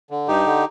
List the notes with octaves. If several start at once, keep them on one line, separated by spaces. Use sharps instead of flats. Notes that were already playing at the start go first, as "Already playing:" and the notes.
D3
G2 D#4 G4
D3